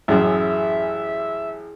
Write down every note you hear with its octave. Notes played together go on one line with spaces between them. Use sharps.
A1 F#2 E4 G#4 E5